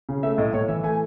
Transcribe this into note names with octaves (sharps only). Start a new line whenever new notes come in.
C#3
A3 E5
A2 D#5
A2 C#5
E3 E5
A3 G#5